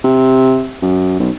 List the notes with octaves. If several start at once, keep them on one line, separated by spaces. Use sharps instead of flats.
C3
F#2
B1